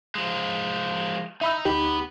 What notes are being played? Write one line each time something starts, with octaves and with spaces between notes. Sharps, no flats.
F3 G#3
D#4 E5 B5 E6
D2 B3 D#4 G4 B5